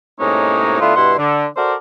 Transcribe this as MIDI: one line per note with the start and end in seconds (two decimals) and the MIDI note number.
0.19 0.78 45
0.19 0.78 48
0.19 0.78 56
0.19 0.78 58
0.19 0.78 61
0.19 0.78 63
0.80 0.95 50
0.80 0.95 57
0.80 0.95 59
0.80 0.95 64
0.80 0.95 65
0.96 1.13 43
0.96 1.13 47
0.96 1.13 64
0.96 1.13 78
0.96 1.13 84
1.17 1.46 50
1.56 1.74 66
1.56 1.74 69
1.56 1.74 70
1.56 1.74 72
1.56 1.74 74